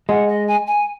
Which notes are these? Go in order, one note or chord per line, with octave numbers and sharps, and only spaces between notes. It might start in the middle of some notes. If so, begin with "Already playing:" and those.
G#3 F#5
D#5
G#5
G#5